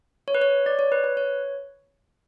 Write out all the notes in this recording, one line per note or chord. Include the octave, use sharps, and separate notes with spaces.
C#5
B4
C#5
D5
C#5
B4
B4
C#5